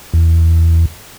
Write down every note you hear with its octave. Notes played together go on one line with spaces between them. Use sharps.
E2